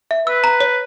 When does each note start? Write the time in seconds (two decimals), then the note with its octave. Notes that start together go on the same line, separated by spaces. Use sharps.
0.11 E5
0.27 B4 E6
0.44 A#5
0.60 C#5